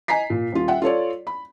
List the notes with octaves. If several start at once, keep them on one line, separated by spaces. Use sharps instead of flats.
D#5 G#5 A#5 B6 C7
A#2
D#1 F4
E5 F#5 G5
F4 A4 C#5 D5
B5